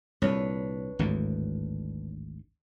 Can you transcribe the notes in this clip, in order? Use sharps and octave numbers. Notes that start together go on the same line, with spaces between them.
C2 A#2 D4 B4 C#5
G#1 D2 A2